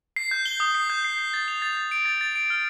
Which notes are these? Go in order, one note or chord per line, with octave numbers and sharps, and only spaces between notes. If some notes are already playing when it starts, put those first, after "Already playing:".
C7
G6
G7
D#6
C7
G6
C7
C7
A6
F7
A6
A6
D7
A6
A6
D7
F6